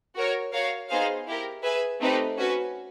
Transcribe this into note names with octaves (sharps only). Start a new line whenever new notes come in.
F#4 A#4 C#5
F#4 A#4 C#5 F5
B3 D#4 G#4 C5 F5
E4 G4 A#4
G#4 B4 E5 G#5
A3 C4 D#4 G4 B4
C#4 F#4 B4